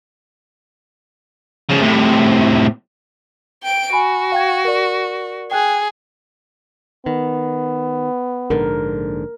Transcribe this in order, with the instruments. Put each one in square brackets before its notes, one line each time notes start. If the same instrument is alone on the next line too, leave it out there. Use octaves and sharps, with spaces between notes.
[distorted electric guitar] C#3 F3
A2 C3
[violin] G5 D7
[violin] F#4 [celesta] G#5 B5
[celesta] F5 G5 G#6
A#4 D5
[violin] G#4 [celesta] G5 F#6 G#6
[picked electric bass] D#3 [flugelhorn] B3
[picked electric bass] A#1 G#2 D3 [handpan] A#4